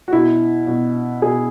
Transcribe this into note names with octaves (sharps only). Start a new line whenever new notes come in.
F#4
B2 E4
B2
B2 G#4